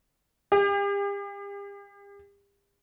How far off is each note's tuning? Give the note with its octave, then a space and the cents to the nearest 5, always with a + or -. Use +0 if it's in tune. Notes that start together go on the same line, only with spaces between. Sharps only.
G4 +40